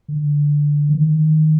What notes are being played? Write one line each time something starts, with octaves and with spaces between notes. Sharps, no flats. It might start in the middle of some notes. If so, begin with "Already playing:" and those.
D3
E3
D#3